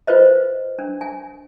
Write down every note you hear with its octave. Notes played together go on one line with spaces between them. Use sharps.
F4 B4 C5 D#5
D4
G#5